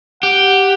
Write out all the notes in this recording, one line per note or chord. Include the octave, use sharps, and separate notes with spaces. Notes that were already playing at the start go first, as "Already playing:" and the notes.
G4 F#5